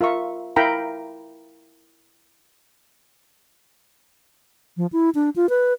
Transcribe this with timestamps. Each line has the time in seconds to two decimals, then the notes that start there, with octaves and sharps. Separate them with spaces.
0.01 F4 A#4 E5 C#6
0.56 E4 A#4 F5 G5 A#5 B5
4.77 F3
4.93 E4
5.15 D4
5.36 F4
5.49 B4